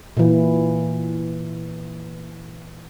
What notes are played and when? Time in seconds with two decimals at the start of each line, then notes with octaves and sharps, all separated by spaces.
0.17 A#2 E3